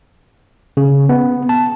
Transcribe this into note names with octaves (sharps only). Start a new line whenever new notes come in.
C#3
B3
A5